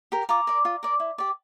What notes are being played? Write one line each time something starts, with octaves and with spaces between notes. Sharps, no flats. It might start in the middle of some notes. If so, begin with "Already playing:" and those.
G4 A#4
F4 A#5 D6
A#4 D5
F4
A#4 D5
E4
G4 D5